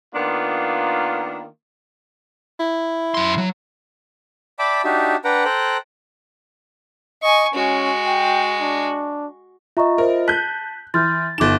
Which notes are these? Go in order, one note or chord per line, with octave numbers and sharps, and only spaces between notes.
D#3 A#3 B3 D4 F4
E4
F#2 C6
F#3
D5 E5 G5 A5 B5 D6
D4 D#4 F#4 G4 E5
D4 B4 F#5 G5 A#5
A4 C5 G5 A#5 F#6
D#5 G#5 C#6
G#3 C#4 F#4
G5
D4
F4 D#5 E5 A#5 C#6
A#4 C5 E5
A5 F#6 G6 B6
E3 C6 F6 G6 A6
G1 D#4 D6 A6 E7